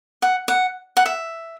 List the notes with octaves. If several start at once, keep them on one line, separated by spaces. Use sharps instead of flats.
F#5
F#5
F#5
E5